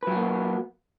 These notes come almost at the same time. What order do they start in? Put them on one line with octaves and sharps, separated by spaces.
B4 F#3 F#4 A#3 B3